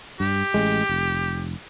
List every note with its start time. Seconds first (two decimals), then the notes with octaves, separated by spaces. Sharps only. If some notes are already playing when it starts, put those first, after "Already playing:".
0.20 G2 G4
0.54 A1 G#3
0.89 F1